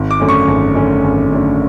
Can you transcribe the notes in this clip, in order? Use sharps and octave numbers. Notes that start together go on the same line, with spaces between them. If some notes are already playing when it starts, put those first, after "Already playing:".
Already playing: G#1
D6
F#2 D3 A3 C#4
C#6
G#1
F#2 D3 A3 C#4
G#1
F#2 D3 A3 C#4